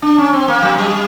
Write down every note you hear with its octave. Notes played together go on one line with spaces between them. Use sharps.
D4
C#4
C4
A#3
F#3
G3